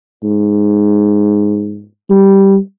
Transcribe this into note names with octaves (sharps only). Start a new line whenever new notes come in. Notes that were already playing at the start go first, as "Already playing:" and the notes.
G#2
G3